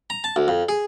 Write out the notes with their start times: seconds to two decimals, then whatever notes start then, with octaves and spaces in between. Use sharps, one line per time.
0.10 A#5
0.24 A5
0.36 D2
0.48 F2
0.69 G#4